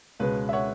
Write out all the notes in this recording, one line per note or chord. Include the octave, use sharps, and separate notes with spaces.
C#2 B2 G#3 C#4 B4
E5
C#5 F#5